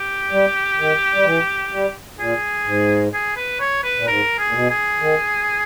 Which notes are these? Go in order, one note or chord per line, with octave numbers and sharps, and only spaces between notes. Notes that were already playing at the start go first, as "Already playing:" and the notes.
Already playing: G4
G3
D#3
G3
E3
G3
A#2 G#4
G#2
G#4
B4
C#5
B4
A#2
G#2 A#4
G#4
A#2
B2
G#4
D#3